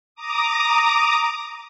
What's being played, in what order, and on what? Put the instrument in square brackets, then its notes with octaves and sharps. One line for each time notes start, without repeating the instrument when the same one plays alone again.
[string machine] A#5 D6 D#6